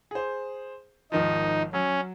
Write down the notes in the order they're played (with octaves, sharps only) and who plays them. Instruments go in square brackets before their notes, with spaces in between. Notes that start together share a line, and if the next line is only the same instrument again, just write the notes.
[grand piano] G#4 C5
[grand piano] G#1 D#3 F3 [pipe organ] D#4
[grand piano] F#3 [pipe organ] C#4